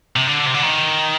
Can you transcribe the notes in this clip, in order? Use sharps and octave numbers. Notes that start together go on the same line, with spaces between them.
C3
D3
C3
D3
D#3